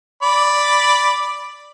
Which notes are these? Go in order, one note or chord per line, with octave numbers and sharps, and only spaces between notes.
D5 B5